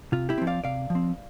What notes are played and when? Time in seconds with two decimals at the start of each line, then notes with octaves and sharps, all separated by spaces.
0.12 C3 F4
0.29 E4 G4
0.38 F3 C4
0.47 D5 F5
0.64 C3 D5 F5
0.90 F3
0.95 C4